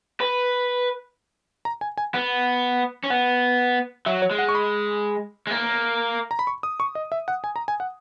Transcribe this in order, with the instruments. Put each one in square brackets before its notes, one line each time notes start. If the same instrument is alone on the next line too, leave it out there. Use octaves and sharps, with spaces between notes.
[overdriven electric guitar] B4
[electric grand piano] A#5
G#5
G#5
[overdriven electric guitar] B3 [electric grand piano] F#5
[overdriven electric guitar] C#4
[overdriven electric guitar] B3 [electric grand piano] F#5
[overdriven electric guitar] F#3 [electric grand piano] E5
[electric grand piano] C#5
[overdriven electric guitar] G#3
[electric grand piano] F#5
C#6
B5
[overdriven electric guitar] G#3
A#3
[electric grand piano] A#5
B5
C#6
D#6
C#6
D#5
E5
F#5
G#5
A#5
G#5
F#5